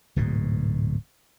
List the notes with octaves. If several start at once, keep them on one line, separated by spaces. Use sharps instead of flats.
D1 G#2 B2